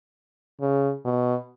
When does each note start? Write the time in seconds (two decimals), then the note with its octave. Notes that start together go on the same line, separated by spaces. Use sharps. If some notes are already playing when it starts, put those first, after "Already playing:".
0.61 C#3
1.05 B2